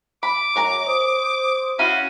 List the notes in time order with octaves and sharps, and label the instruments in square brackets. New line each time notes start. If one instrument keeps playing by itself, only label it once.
[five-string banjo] B5 [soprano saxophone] D6
[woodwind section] F#2 [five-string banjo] C#5 G#5 A#5
[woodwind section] C5 D#6
[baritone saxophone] C#4 [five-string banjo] E4 F5 [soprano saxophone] F#4